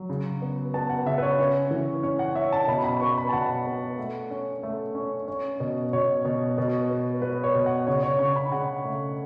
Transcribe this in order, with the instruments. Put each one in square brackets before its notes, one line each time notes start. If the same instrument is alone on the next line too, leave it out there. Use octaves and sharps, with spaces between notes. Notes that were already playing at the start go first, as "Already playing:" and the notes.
Already playing: [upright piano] F#3
C#3
B3
B3 A5
F#5
C#3 E5
B4
C#5
C#4
E3
C#4 C#5
F#5
C#4 E5
A5
B2 B5
B5
B3 C#6
B5
A5
B2 F#5
B3
A3
C#4
A3
C#4
C#4
B2
B2 C#5
B2
B2
B3
B3 B4
C#5
B2
F#5
C#3 C#5
C#5
C#3 C#6
B5
C#3 F#5
A3